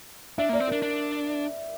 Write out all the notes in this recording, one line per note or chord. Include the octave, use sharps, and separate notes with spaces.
D4 E5
A#3 D5
C4
D4 A#4
D4